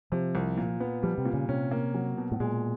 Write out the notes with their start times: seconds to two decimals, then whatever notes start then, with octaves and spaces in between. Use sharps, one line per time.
0.12 C3 F3
0.35 C2
0.57 A#2
0.80 B3
1.03 F3 G3
1.18 C3
1.25 A#2
1.34 C#3
1.49 C3 C#4
1.71 A#3
1.94 F#3
2.17 B2
2.32 A2
2.40 A#2 G#3